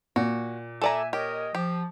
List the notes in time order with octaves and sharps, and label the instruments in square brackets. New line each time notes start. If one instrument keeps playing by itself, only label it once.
[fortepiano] A#2 [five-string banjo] F#4
[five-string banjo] A4 D5 A#5 [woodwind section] E5 G#5
[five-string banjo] G4 [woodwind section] A#4 C#5 D#5
[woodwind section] F3 [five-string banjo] G4